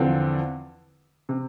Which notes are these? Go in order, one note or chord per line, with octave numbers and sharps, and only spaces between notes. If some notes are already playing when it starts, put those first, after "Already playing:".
Already playing: E2 D3 F3 C4
C3